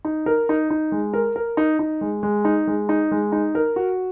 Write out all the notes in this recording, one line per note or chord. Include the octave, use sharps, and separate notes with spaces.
D#4
A#4
D#4
D#4
G#3
A#4
A#4
D#4
D#4
G#3
G#3
D#4
G#3
D#4
G#3
D#4
A#4
F#4